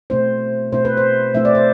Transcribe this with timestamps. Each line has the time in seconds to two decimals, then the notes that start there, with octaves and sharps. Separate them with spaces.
0.10 B2 A3 C4 E4 C5
0.72 B2 A3 C4 E4 C5
0.85 B4
0.97 C5
1.34 B2 A3 C4 E4 E5
1.45 D5
1.55 C5